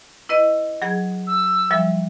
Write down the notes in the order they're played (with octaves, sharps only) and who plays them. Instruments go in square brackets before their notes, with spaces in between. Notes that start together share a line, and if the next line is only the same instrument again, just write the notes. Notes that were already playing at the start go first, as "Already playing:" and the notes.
[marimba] E4 B4 D#5
F#3 G#4 G#6
[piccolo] E6
[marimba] F3 G3 E5